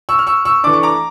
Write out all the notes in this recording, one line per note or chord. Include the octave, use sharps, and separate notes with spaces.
C#6 E6
F6
C#6 E6
C#6 E6
E3 A3 D4 D6
C#6
A#5 D6